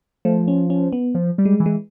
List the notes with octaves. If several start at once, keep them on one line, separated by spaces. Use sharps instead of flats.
F3 A3
C#4
C#4
B3
F3
G3
G#3
E3
G#3